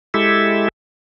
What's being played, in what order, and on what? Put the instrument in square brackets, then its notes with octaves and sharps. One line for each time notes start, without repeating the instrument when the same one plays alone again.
[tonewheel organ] G#3 E4 G4 A4 E5